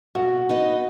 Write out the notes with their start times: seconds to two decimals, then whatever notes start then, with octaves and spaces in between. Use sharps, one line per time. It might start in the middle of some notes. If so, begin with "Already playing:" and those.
0.15 B2 F#4
0.49 B3 D#4 B4 D#5